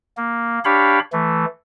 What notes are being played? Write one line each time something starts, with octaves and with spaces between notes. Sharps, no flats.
A#3
D4 G4 C#5 F5 B5
E3 A3